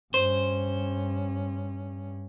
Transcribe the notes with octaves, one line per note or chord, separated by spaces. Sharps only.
G2 C#4 C5